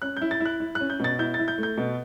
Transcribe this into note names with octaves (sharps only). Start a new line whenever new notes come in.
C#4 F#6
E4 G6
A6
E4
F#6
E4
C#4 F#6
G6
B2 A6
E4 G6
A6
E4
G6
A3
G6
B2